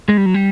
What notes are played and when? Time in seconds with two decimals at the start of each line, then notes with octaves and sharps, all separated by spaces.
0.09 G#3
0.17 G3
0.26 F#3
0.34 G3